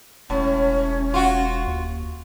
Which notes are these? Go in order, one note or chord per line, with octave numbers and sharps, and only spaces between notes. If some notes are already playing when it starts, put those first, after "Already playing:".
E1 A2 C#4
F4 F#4
D#2